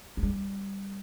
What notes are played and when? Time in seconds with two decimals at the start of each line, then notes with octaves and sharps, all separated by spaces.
0.17 G#3
0.23 G3